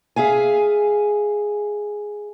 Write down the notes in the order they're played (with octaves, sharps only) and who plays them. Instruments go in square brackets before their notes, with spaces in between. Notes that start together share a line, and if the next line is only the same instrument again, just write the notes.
[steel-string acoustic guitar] G#4 E5 F5 G#5